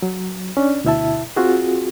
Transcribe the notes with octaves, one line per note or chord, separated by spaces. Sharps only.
F#3
C#4 D4 D5
D2 B2 E4 E5 A5
C4 F4 F#4 G#4